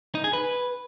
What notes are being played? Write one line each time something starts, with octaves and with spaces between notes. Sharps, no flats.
D#4
G#4
B4